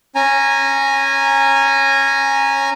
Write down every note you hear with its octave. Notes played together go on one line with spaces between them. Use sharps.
C#4 G#5 A#5